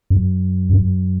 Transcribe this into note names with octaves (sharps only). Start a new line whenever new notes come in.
F#2
F#2